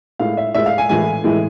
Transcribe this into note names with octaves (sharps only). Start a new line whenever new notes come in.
A2 G#3 F5
E5
A2 G#3 E5
F5
G#5
A2 E3 G#3 G#5
A2 E3 G#3